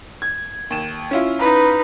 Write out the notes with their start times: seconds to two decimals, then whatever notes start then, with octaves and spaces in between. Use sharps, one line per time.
0.22 G#6
0.70 D#2 E7
1.11 C#4 E4 F4
1.39 D#4 B4